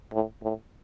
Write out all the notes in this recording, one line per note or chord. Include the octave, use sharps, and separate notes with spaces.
A2
A2